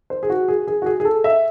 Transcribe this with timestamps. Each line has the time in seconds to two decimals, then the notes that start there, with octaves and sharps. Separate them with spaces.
0.10 C5
0.23 G#4
0.30 F#4
0.48 G#4
0.67 G#4
0.82 F#4
0.86 G#4
1.00 G#4
1.05 A4
1.24 E5